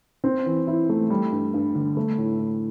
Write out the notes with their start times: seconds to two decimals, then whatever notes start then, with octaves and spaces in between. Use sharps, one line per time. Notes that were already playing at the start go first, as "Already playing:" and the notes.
0.24 C4
0.46 E3
0.67 E4
0.89 A3
1.10 G3
1.32 G2
1.54 G2
1.75 D3
1.97 A3
2.18 A2
2.39 A2